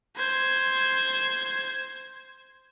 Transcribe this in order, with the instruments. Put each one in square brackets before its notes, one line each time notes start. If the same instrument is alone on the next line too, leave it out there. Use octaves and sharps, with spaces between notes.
[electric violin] C5 G#6